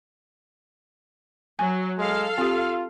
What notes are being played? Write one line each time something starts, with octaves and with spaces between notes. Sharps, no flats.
F#3 G#5
G#3 A4 F5
C4 F4 G4